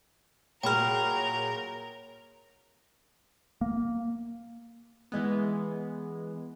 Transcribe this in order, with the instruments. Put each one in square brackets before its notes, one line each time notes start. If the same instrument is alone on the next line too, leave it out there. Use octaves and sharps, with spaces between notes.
[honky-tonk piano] A#2 G#4 [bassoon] F#3 [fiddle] A#4 [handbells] G5 B5 F6
[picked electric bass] A#3
[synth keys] E3 G#3 B3